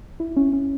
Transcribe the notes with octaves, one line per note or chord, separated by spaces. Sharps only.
E4
C#4
C#4